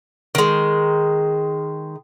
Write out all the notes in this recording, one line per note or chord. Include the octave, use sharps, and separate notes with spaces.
D#3 G#3